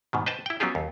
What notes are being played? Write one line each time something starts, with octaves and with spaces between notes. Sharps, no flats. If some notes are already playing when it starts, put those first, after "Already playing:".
G#2 B2 D#3
B4 C5 D#5 G5 A5
E4 G5
F#3 B3 C#4 F4 G4 G#4
D#2